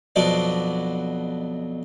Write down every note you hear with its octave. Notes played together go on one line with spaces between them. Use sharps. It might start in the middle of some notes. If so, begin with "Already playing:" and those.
F2 B2 F#3 D4 D5